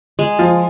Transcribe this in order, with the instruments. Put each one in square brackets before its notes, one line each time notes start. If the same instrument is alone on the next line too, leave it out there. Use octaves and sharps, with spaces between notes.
[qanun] G#3
[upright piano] F3 F4